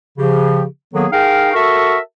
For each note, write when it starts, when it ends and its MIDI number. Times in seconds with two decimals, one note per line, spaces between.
0.18 0.64 49
0.18 0.64 53
0.18 0.64 67
0.94 1.06 51
0.94 1.06 54
0.94 1.06 58
0.94 1.06 59
0.94 1.06 68
0.94 1.06 69
1.12 1.54 63
1.12 1.54 68
1.12 1.54 70
1.12 1.54 77
1.12 1.54 79
1.55 1.99 66
1.55 1.99 69
1.55 1.99 70
1.55 1.99 76
1.55 1.99 81
1.55 1.99 85